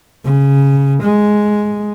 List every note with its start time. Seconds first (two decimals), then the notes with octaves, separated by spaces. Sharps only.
0.24 C#3
1.03 G#3